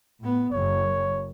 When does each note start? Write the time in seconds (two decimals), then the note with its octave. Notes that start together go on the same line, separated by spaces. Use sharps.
0.20 A2 B3
0.52 F#1 F#2 C#5